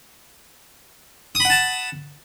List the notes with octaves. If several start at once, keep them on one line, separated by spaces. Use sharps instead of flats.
F#5 A5 B5 D#6